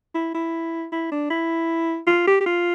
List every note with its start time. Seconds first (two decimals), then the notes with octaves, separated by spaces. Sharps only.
0.15 E4
0.34 E4
0.92 E4
1.12 D4
1.30 E4
2.07 F4
2.28 G4
2.41 G4
2.46 F4